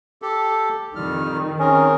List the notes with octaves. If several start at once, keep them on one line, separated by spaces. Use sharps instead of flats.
G4 A4
F2 D#3 G3 F6
C4 C#4 G#4 A#4